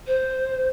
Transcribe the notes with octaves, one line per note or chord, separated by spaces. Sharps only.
C5